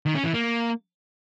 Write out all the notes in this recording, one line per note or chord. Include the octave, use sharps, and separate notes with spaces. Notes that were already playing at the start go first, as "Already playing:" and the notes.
D#3
C#4
E3
A#3